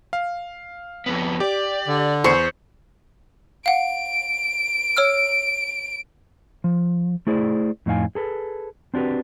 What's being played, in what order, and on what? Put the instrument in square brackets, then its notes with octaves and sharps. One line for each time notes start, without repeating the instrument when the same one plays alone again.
[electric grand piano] F5
[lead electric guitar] F2 B3
[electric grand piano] G4 [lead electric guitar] D5
[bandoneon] D3
[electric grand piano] E2 C#6 C#7 [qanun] C5
[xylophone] F5 F#5 [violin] D7
[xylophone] C#5 E6 F6
[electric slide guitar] F3
A3 E4 G#4 C5 D5
F2 A2 D#4 F5 G#5
G#4 A4 B4
C4 D4 F#4 G4 B4